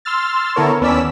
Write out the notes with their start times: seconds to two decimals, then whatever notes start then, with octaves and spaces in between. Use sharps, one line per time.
0.05 C6 E6 F6 A6
0.56 D3 B3 E4 A4 A#4 C#5
0.81 D#2 B3 C#4 D5 E6 B6